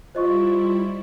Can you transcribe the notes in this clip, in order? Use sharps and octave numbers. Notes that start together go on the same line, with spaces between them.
G3 E4 F4 C5 D#5 C#6